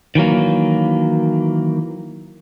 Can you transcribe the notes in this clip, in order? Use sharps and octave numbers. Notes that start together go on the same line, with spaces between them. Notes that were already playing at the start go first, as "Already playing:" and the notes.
D#3 E3 F#3 A#3